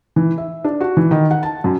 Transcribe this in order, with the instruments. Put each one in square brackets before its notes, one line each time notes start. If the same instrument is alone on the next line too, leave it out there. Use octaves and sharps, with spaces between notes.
[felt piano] E3
E5
D4
F#4
E3
D#3
F#5
A5
F#2